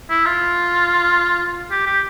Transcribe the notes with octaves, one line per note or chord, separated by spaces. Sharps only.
E4
F4
G4
G4